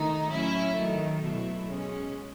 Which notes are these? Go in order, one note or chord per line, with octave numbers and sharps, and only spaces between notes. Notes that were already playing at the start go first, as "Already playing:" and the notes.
Already playing: D#3 A3 D#4
A2 F#3 C#4 E4
D#3 F#3 A3
B2 F#3 A3 E4
B2 G#3 C#4